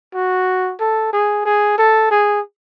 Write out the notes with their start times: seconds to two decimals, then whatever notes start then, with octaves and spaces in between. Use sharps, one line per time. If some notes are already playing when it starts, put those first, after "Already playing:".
0.14 F#4
0.80 A4
1.13 G#4
1.45 G#4
1.78 A4
2.11 G#4